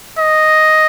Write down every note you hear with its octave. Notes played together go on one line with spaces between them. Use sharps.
D#5